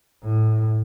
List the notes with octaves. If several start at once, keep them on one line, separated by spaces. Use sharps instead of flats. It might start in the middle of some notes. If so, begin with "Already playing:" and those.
A2